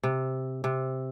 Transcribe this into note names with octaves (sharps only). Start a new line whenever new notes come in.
C3
C3